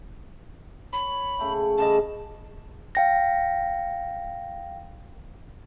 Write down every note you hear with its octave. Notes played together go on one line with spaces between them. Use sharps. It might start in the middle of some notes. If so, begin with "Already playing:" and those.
C#5 B5
C#3 A3 G5
C#3 G3 D#5 A5
F5 G5 A#6